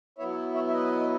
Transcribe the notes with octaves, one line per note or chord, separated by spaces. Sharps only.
F#3 B3 E4 C#5 E5
C#5 E5
E5
B4 D#5